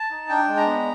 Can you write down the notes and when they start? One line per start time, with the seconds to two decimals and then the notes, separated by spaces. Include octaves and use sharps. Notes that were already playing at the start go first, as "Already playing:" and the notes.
Already playing: A5
0.11 D#4
0.29 D4 G5
0.47 G#3
0.57 A#5
0.66 B3